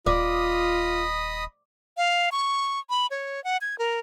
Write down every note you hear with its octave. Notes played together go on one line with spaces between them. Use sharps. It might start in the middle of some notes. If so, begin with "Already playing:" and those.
D#1 F4 D5 D#5 B5 D#6
F5
C#6
B5
C#5
F#5
G#6
A#4